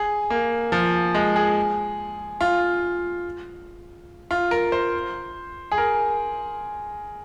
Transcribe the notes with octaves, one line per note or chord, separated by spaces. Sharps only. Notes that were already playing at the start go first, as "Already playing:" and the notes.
Already playing: G#4
A#3
F3
G#3
G#4
F4
F4
A#4
C5
G#4
A#4